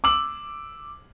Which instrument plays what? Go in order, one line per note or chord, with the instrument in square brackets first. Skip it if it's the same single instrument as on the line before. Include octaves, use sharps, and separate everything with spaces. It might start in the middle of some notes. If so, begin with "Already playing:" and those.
[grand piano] D6 E6 F#7